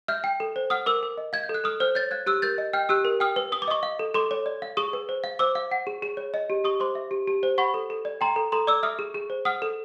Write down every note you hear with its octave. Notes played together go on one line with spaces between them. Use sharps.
E5 F6 G6
G5
A4
C5
F#5 D#6 F6
A#4 D6 E6
A#4
D#5
F5 G#6
G6
A4
F#6
A4 D#6 F6
C5 F6 G6
C#5 G6 A6
F5 F#6 G#6
G4 E6 F#6
A#4 G6 A6
D#5
G5 F6 G6
G4 E6 F#6
A#4
G5 D#6 F6
B4
B4 D#6
D6
D#5 C#6 D#6
F5
A4
A4 C6 D6
C#5
D5
F5
G#4 C#6 D#6
B4
C5
F5
C5 D6 E6
F5
F#5
G#4
G#4
C#5
D#5
G4
G4 C#6 D#6
C5 C6 D6
E5
G4
G4
C5
F#5 B5 C#6
A4
A4
D5
G5 A#5 C6
A4
A4 A#5 C6
D5 D6 E6
E5 D#6 F6
G#4
G#4
C5
F#5 D#6 F6
A4